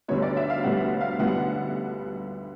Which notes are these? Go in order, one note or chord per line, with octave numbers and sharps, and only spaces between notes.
D2 D3 G3 B3 C#5
D5
E5
F5
D2 D3 G3 B3 F#5
F5
D2 D3 G3 B3 F#5